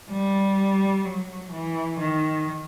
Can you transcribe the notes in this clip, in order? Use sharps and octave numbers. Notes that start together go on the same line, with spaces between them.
G3
F#3
E3
D#3